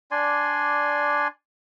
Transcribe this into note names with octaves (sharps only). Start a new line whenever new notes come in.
D4 D5 G#5 C6